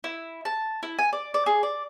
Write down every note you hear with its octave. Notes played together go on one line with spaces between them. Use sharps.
E4
A5
E4
G#5
D5
D5
G#4
D5